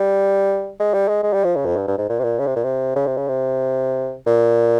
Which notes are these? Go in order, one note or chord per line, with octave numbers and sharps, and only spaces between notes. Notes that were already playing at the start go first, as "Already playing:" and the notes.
Already playing: G3
G#3
G3
G#3
G#3
G3
F3
C#3
F2
G2
G2
G#2
A#2
C3
A#2
C#3
C3
A#2
C3
C#3
C3
C#3
C3
A#2